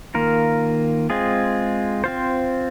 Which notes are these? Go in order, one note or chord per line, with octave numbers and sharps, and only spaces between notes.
D#3 A#3 F4 A#4
G#3 C4 F4 G#4
C4 F4 C5